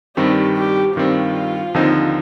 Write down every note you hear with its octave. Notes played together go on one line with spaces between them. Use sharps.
G2 D#3 G3 C4 G4
G4
G2 D#3 G3 C4 F4
D#2 D3 F3 C4 D#4